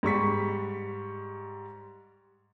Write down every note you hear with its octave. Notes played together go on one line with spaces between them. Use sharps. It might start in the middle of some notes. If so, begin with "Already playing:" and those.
G#2 G3 C#6 B6